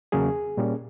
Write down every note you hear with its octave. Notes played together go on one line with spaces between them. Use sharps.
E2 C#3 F#3 A#3 C#4 G#4
A#2 G3 A#3 C#4